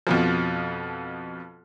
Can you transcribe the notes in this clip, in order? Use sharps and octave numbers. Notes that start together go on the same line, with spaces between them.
F2 B2 F3